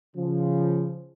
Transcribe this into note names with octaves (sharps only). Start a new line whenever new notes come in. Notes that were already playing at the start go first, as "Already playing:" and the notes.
C#3 F3